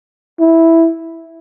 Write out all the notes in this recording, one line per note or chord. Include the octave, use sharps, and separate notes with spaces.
E4